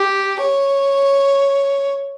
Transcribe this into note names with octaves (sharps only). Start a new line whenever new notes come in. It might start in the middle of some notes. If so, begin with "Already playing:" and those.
Already playing: G4
C#5